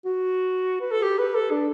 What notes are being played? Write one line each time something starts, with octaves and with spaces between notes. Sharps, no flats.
F#4
B4
A4
G4
B4
A4
D4